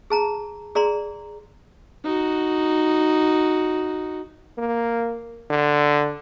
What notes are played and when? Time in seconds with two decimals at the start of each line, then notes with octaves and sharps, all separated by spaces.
0.10 G#4 A5 A#5
0.75 G#4 D5 A#5 C6
2.04 D#4 F#4
4.58 A#3
5.50 D3